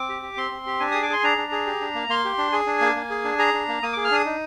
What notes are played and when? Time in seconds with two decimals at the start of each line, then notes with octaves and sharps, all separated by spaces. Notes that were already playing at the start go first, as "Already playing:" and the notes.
Already playing: C4 D6
0.09 G4
0.22 G4
0.37 C4 C6
0.51 C4
0.66 G4
0.80 D4 G#5
0.91 G#4 D#6
1.02 D6
1.10 G#4 C6
1.24 D4 A#5
1.38 D4
1.52 G#4
1.67 G4
1.81 D4
1.95 A#3
2.09 A#3 C6
2.25 G4
2.38 D4
2.52 G#4 G#5
2.67 D4
2.81 A#3
2.96 A#3
3.10 G#4
3.24 D4
3.39 G#4 A#5
3.54 D4
3.69 A#3
3.83 A#3 D#6
3.93 G#4 D6
4.05 F6
4.11 D4 D#6
4.26 D#4